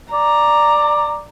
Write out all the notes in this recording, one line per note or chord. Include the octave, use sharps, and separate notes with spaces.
D5 A#5